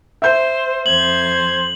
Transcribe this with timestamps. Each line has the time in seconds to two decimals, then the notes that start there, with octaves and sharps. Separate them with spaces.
0.22 C5 E5 G6
0.86 F2 C5 G#6 F#7